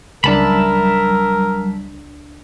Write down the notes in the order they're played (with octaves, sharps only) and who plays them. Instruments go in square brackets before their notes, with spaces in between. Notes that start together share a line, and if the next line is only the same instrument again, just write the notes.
[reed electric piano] C#2 D4 [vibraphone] F#3 G3 [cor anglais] A#4 [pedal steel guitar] E5 A5 B5